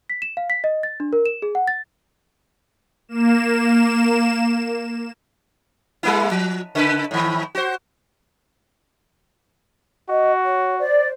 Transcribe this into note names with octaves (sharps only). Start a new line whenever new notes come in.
B6
E7
F5
B6
D#5
A6
D4
A#4
E7
G#4
F#5
A6
A#3 E7
G3 A#3 E4
F3
C#3 B4
A2 D#3
F#4 C5
F#4 D#5
C#5
C5 D5